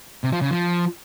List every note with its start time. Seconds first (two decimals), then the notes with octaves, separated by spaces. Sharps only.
0.24 C3
0.33 F3
0.42 C#3
0.51 F3